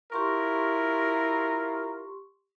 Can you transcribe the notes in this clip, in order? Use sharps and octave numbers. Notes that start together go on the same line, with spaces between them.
E4 F4 G4 A#4 C6 C#6